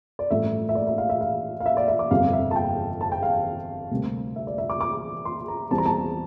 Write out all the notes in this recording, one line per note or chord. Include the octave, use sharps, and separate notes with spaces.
D5
A1 G2 F3 A3 E5
E5
D5
E5
F5
E5
F5
F5
E5
D5
E5
D6
G1 F2 C3 G3 F5
E5
A5
G5
A5
G5
F5
D2 C3 G3 A#3
E5
D5
E5
D6
D6
C6
A#5
E2 E3 G3 C4 A5
A#5
A5